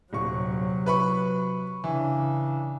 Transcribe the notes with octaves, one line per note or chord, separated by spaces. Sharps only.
D#1 C3 F#3 C#6
B4 B5 C#6
C#3 E3 D4